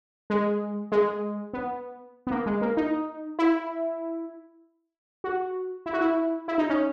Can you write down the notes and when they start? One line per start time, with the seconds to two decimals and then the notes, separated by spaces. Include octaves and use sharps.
0.30 G#3
0.92 G#3
1.53 B3
2.27 B3
2.31 A#3
2.46 G#3
2.62 A#3
2.77 D#4
3.39 E4
5.24 F#4
5.86 E4
5.93 F#4
6.01 E4
6.48 E4
6.58 D#4
6.70 C#4